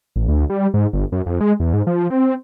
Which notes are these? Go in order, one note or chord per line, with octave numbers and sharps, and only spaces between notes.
A1
D2
G3
G#2
G1
F#2
F2
G#3
E2
G#2
F3
C4